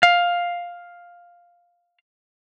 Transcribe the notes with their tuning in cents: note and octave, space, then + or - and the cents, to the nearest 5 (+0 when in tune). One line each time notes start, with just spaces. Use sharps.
F5 +5